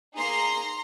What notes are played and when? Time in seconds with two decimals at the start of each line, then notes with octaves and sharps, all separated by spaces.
0.16 A#3 D#4 G#4 A#5 C6